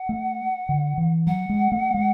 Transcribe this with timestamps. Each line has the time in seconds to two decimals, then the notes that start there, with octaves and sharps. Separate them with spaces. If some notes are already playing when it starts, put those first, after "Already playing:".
Already playing: F#5
0.09 A3
0.69 D3
0.98 E3
1.27 F#3 F#5
1.49 G#3
1.72 A3
1.94 G#3